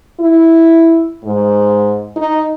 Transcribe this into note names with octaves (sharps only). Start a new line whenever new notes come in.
E4
G#2
D#4